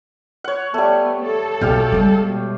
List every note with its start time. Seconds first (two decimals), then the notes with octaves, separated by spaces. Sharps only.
0.44 C#5 F#5
0.74 G3 A3 B3
1.25 A4
1.61 B1 A#2 G4 F5 G5
1.92 G3 G#3
2.24 B2